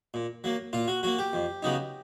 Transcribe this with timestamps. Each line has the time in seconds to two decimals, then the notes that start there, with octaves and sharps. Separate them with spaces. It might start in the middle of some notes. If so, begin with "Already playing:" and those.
0.14 A#2
0.44 F#3 A#3
0.73 A#2 F4
0.88 F#4
1.03 F#3 A#3 F#4
1.19 G4
1.33 F2
1.63 C#3 F#3 B3 D#4